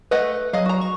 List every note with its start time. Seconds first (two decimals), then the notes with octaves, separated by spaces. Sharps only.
0.11 A3 B4 D#5 F#5
0.53 F#3 G#4 D#5 F5
0.66 F#4 A#5
0.81 C#6